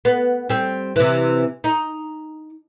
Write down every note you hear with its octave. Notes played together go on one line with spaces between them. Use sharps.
B3
G3 C4
C3 E3
D#4